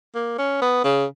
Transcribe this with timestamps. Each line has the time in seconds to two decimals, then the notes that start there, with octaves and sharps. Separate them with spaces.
0.15 A#3
0.38 C#4
0.62 B3
0.84 C#3